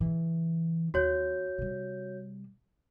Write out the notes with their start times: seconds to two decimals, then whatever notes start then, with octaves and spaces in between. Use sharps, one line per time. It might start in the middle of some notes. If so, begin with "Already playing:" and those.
0.01 C#3 E3
0.94 D#2 F#4 C#5 G6
1.58 C3 G3